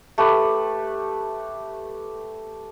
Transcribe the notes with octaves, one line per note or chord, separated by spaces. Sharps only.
A3 G4 B4